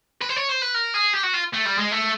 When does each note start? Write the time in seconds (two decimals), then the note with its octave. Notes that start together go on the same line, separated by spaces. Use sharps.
0.21 B4
0.29 C5
0.37 C#5
0.49 C5
0.62 B4
0.75 A#4
0.94 G#4
1.14 G4
1.23 F#4
1.33 F4
1.53 A3
1.65 G3
1.78 G#3
1.91 A3